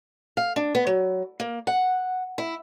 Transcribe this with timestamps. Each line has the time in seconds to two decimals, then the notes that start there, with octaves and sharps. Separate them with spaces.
0.37 F5
0.56 D4
0.75 B3
0.87 F#3
1.40 A#3
1.67 F#5
2.38 E4